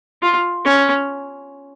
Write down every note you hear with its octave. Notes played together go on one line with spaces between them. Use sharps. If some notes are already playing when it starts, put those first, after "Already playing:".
F4
C#4